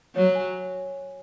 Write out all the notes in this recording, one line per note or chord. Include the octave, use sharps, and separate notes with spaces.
F#3 C#5
G#5